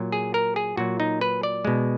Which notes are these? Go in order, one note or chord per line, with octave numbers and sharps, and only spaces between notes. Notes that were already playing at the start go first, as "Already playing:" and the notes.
Already playing: A#2 F#3
G#4
A#4
G#4
A#2 F#3 F#4
D#4
B4
D5
B2 G#3